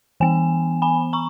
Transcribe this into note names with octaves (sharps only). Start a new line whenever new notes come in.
E3 B3 G#5
G#5 B5
A#5 C#6